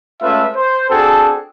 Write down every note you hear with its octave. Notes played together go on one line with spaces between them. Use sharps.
G#3 A3 C#4 F4 B4 E5
C5
C4 D4 F#4 G#4 A4